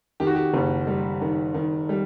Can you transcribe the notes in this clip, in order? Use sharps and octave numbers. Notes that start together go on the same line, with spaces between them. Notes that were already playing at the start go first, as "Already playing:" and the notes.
D#3 G4
F#4
G4
F#1
G3
D#3
D#3
G3